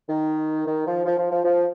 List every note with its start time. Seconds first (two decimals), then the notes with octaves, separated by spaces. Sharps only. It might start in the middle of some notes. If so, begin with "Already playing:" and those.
0.09 D#3
0.67 D#3
0.87 F3
1.05 F3
1.18 F3
1.31 F3
1.44 F3